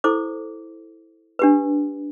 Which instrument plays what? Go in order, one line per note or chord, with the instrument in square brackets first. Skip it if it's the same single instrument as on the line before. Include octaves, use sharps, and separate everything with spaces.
[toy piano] E4 A4 C5 D6
D4 G4 B4